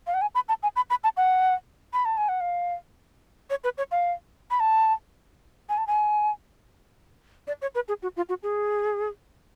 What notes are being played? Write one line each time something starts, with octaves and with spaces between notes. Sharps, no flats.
F5
F#5
G#5
B5
A5
G#5
B5
B5
A5
F#5
B5
A5
G#5
F#5
F5
C#5
B4
C#5
F5
B5
A5
G#5
A5
G#5
D5
C#5
B4
G#4
F#4
F4
F#4
G#4